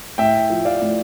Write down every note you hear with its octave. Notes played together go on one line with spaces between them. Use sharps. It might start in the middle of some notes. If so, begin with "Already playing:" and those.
A2 E5 G5
F3
D5 F5
A2